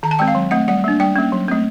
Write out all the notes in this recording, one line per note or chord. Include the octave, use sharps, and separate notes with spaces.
D#3 A#5
A5
G#3 C4 G5
F5
F#3
A3 C4 F#5
G3 F#5
A#3 D4
G3 G5
A#3 C#4
F#3
A3 C4